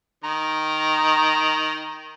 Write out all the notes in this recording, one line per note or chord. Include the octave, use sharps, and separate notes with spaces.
D#3 A#5